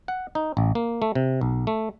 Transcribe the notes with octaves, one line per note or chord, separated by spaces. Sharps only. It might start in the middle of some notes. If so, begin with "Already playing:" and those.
F#5
D#4
A1
A#3
A3
C3
B1
A3